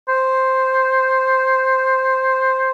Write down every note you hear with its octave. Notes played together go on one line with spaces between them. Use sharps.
C5